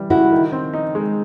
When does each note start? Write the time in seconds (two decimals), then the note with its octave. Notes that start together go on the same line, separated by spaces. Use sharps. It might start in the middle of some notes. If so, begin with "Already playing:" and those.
Already playing: E3 G3
0.10 C#3 E4 F#4
0.32 D#3
0.52 C4
0.74 D#4
0.95 G#3